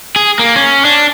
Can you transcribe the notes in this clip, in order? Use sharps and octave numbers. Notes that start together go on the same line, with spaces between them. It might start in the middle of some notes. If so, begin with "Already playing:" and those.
G#4
A#3
C#4
D4